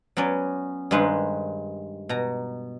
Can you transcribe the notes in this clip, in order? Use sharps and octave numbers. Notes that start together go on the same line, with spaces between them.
F#3 B3 C#4 D5
G2 D#3 G#3 B4 C5 A#5
B2 A#5